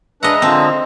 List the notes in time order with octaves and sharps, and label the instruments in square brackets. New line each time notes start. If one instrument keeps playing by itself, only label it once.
[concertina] G#3 E5 A#5 [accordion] D4 B4 [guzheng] D#5 F#5
[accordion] D3 F3 [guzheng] C4 [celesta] A5 C6 D#6